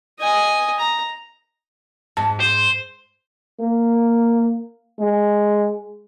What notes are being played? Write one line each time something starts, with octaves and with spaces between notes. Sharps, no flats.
D#5 G#5
A#5
G#2 A5
C5
A#3
G#3